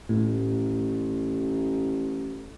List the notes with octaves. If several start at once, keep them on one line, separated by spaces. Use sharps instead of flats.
A1 A2